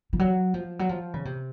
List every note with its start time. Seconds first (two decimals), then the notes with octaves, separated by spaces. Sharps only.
0.13 F3
0.19 F#3
0.54 F3
0.79 F#3
0.89 F3
1.14 C#3
1.25 C3